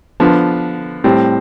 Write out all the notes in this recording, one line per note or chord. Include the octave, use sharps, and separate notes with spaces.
D3 F3 B3
A2 G3 C4